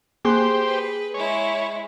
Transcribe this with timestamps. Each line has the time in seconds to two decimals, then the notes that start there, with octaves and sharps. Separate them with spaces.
0.25 A#3 G4 G#4 C5 C6 F#6
0.65 B4
1.14 G#3 E4 C#5